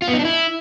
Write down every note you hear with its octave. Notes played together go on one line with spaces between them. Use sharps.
F4
B3
D#4
D4
E4